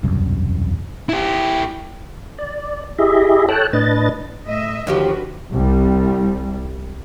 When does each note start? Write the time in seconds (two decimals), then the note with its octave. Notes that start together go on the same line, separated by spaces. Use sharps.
0.03 E1 C2 F#2
1.09 E4 G4
2.39 D5
2.98 E4 G4 G#4 D#5 E5
3.49 A4 C#5 G5 A5 F#6
3.73 A2 D4 B4 D#5 A6
4.46 A2 D#5 E5
4.87 D#2 D3 F3 F#4 G4 B4
5.53 C2 G3